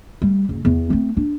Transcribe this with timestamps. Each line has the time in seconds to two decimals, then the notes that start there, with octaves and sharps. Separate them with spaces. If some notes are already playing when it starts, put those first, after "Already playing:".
0.22 G3 A3
0.49 F#1
0.65 E2 B3
0.90 A3 C4
1.17 D4